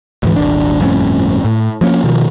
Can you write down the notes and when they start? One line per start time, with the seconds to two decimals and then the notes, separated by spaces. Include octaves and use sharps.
0.23 D2 G#2 E3
0.36 D#1 G#1 D4
0.80 G1 F2 A2 C#4
1.45 A2
1.81 F3 A#3 C#4
2.04 B2 D#3 F3